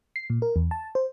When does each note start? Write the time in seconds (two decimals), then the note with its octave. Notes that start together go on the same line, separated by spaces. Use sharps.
0.16 C7
0.30 A#2
0.42 A#4
0.56 E2
0.71 A5
0.95 C5